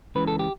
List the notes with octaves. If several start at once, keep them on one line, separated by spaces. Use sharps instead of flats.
C#2 C#3 E3 B4
A4
G4